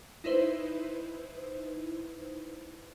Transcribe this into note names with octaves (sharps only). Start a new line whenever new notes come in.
D#4 E4 B4 C5